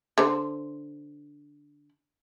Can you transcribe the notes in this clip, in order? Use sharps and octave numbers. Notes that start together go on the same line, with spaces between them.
D3 C5